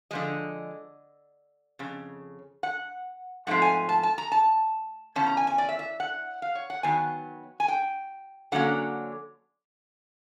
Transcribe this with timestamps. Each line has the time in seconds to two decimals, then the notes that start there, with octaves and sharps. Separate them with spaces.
0.11 D3 F3 G#3 D#5
1.79 F2 C#3
2.63 F#5
3.47 G#2 F3 A3 C4 F4 F#5
3.62 G#5
3.89 A5
4.03 A5
4.18 A#5
4.32 A5
5.16 E2 C#3 C#4 A5
5.26 A#5
5.37 G#5
5.47 G#5
5.58 D5
5.69 E5
5.79 E5
6.00 F#5
6.42 F5
6.55 C#5
6.70 F#5
6.83 D#3 F#3 B3 G#5
7.60 G#5
7.68 G5
8.52 D3 F#3 A#3 C#4 F#5